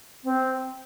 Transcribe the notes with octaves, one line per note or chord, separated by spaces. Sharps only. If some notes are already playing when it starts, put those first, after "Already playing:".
C4